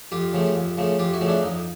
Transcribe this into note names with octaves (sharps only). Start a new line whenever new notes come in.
F2 F4 G4
C#3 F3 A3
F2
C#3 F3 A3
F2 F4 G4
E4 F#4
C#3 F3 A3
D4 E4
F2 D#4